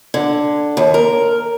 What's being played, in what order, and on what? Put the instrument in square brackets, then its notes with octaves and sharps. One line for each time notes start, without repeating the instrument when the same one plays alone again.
[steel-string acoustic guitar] D3
D#2
A#4